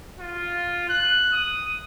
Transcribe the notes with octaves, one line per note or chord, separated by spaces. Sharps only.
F4
F#6
D#6